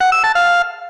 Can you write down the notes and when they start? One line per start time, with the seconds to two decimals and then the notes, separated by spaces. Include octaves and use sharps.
0.01 F#5
0.12 E6
0.24 A5
0.35 F5